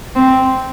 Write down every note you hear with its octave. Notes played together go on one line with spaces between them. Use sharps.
C4